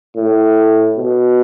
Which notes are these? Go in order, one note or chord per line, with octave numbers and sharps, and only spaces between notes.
A2
B2